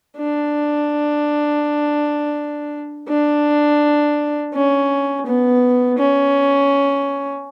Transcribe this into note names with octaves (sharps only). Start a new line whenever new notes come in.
D4
D4
C#4
B3
C#4